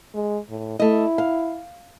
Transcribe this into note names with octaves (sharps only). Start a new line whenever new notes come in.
G#3
A2
A3 E4 D#5
F5